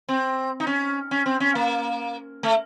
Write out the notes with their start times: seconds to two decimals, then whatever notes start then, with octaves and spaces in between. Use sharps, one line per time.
0.09 C4
0.60 D#4
0.67 C#4
1.11 C#4
1.26 C4
1.40 C#4
1.55 A#3
2.43 A3